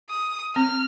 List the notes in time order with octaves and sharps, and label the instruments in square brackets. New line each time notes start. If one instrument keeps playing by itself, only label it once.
[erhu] D#6
[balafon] C4 [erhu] F6